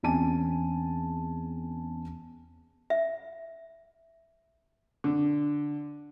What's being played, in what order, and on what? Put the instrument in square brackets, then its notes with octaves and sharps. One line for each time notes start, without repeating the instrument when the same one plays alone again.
[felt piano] E2 C4 C#4 G#5 A5 D#7
[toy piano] E5
[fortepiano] D3